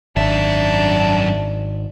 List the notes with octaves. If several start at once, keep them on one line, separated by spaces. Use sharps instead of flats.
G#1 F#2 D4 E5 A5